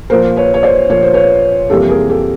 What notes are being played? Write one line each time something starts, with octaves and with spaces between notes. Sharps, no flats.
A#2 F3 A#3 A#4 C5
B4 C#5
C#5
C5 D5
A#2 F3 A#3 C#5
C5
B4 C#5
F2 C3 E3 G3 A#3 G4 A4
G#4 A#4
G4 A4